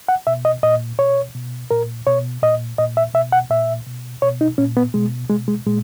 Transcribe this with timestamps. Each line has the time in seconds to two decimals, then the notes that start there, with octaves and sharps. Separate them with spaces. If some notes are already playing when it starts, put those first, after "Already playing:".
0.08 F#5
0.27 B2 E5
0.45 D#5
0.63 A#2 D#5
0.98 B2 C#5
1.35 B2
1.71 A#2 A#4
2.07 B2 C#5
2.43 A#2 D#5
2.78 A#2 D#5
2.97 E5
3.14 B2 E5
3.32 F#5
3.50 A#2 E5
3.87 B2
4.22 B2 C#5
4.41 D#4
4.58 A#2 C#4
4.77 B3
4.94 B2 G#3
5.30 B2 G#3
5.48 G#3
5.67 A#2 G#3